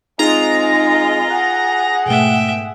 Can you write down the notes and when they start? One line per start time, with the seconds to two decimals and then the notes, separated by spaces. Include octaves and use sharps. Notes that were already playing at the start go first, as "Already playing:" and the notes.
0.19 G#3 C4 D#4 F4 G#4 A#5
1.30 G#4 F#5 F#6
2.06 G#2 B2 A3 E5 G5